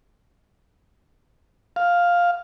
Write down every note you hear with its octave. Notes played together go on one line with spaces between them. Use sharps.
F5